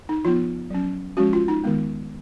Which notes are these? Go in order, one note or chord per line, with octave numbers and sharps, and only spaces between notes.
D#4
F3 B3 F4
F#3 C#4
F3 G#3 C#4 F#4
F4
D#4
D#3 G#3 B3